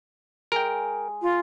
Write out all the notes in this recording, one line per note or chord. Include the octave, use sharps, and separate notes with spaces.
G#3 A#4 G5
F4